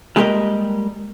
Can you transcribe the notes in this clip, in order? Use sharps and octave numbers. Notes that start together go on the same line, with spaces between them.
G3 G#3 A#3 G4 A#4 D#5